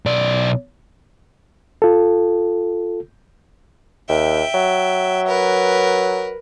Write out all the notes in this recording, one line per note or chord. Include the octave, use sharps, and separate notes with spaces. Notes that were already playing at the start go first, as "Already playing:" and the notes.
B1 D5
F4 A4
D#2 E5 G5
F#3
A#4 B4